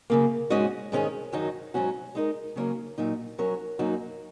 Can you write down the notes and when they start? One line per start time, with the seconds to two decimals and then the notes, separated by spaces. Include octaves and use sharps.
0.10 F#2 C#3 A#3
0.50 G#2 G#3 C#4 F#4 D#5
0.92 G#2 D#3 G#3 C#4 G#4
1.32 F#2 D#3 F#3 D#4 F#4
1.74 G#2 F#3 C#4 F#4
2.15 G#3 D#4 A#4
2.56 C#3 F#3 A#3 C#4 A#4
2.98 A#2 F#3 D#4
3.38 F#3 C#4 F#4 A#4 C#5
3.79 F#2 F#3 A#3 D#4 F#4